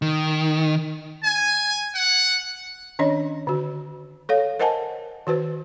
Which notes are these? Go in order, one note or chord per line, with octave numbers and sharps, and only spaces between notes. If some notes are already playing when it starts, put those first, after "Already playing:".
D#3
G#5
F#5
D#3 C#4 D4 C#5 D#5
D3 F#4
A4 C#5 F5
A#4 C5 D#5 F#5 G#5 A5
D#3 F#4 B4 C5